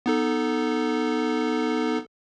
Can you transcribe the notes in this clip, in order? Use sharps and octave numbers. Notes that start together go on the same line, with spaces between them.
B3 D#4 A4